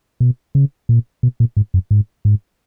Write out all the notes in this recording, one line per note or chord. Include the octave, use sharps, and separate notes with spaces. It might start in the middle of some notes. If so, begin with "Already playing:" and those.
B2
C#3
A#2
B2
A#2
G#2
F#2
G#2
G#2